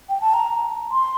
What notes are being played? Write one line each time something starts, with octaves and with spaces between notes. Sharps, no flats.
G5
A5
A#5
C6